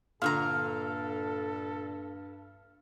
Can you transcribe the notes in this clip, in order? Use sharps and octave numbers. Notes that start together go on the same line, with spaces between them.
G2 A#2 D3 A4 F5 A#5